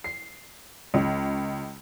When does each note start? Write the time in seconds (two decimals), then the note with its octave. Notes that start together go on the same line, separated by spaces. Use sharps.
0.04 C7
0.94 C#2